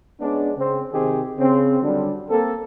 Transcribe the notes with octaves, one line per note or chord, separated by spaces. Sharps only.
G#3 B3 C#4 D4
C#3 C4
C3 D#3 C4 G4 G#4
C#3 C4
D3 F#3 G3 D4
A#3 C4 A4